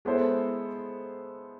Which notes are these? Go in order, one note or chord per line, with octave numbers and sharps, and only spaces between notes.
G#3 B3 E4 A4 C5